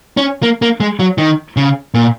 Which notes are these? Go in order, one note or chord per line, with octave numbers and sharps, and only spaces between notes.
C#4
A#3
A#3
G#3
F#3
D#3
C#3
A#2